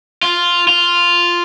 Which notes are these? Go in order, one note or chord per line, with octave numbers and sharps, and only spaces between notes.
F4
F4